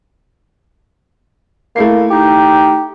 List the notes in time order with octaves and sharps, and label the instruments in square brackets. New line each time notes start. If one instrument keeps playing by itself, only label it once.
[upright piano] A3 E4 C7 [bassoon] A#3
[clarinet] D#4 [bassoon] G4